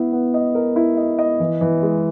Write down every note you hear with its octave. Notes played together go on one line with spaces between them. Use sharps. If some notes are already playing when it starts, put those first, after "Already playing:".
Already playing: B3 E4
B3
D#5
A#4
E4
D#5
D#5
E3
E3
G#3